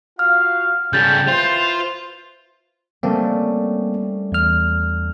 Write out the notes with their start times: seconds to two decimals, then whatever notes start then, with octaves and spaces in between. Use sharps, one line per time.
0.19 F4 F#4 F5 F6
0.93 C#3 G3 C#4 A4 G5 G6 A6
1.28 E4 F4 B4 C5
3.03 G3 A3 A#3 C4 C#4
4.32 E2 F6